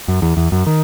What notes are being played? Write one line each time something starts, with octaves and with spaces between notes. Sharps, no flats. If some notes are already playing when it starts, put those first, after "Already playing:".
F#2
E2
E2
F#2
D#3